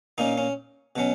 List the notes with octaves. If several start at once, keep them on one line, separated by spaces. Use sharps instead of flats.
A#2 A#3 C#4 D#4
C#4
B2 F#3 C#4